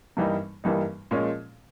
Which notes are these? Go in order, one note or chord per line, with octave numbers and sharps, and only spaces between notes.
G2 E3 G3 A#3 D#4
G2 E3 G3 A#3 D#4
A#2 F3 G#3 C#4